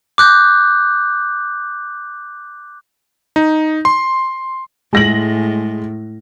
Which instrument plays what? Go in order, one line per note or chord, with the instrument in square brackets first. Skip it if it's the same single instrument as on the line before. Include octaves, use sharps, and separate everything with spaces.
[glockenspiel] D6 F#6 G6
[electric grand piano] D#4
C6
[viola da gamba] A2 [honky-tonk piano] G#3 A#6 F#7